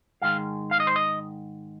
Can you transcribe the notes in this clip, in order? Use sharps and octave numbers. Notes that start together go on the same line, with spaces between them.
G#2 D#3 G#3 F5
F5
D#5
C5
D#5